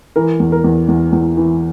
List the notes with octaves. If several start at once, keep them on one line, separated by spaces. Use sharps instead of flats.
E3 A#4
E2
A#4
E2
E2
E2
E3